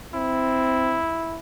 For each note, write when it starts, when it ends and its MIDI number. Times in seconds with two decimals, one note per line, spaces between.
0.14 0.99 60
0.14 1.39 64